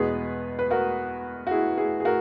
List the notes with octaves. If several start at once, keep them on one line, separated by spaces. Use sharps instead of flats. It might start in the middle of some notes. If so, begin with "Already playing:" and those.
Already playing: E2 B2 G#3 B3 G#4 B4
B4
F#4 A#4
F#4
E4 G#4
E4 G#4
G#4
F#4 A#4